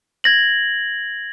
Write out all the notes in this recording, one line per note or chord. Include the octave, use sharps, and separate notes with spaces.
G#6 A#6 F#7